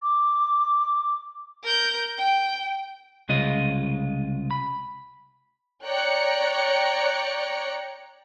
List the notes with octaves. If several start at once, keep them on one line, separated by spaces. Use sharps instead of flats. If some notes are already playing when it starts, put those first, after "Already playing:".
D6
A#4 G6
G5
C2 C#3 G#3 F4 D#5
B5
C#5 D5 G5 A#5 F#6 C#7